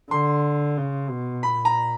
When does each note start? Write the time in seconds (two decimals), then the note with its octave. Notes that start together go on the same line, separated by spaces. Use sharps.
0.11 D3 C6
0.77 C#3
1.10 B2
1.43 A#2 B5
1.65 A#5